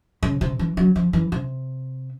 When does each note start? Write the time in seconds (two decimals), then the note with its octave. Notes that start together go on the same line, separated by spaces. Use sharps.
0.23 C#3
0.41 C3
0.59 E3
0.77 F#3
0.96 F3
1.13 E3
1.32 C3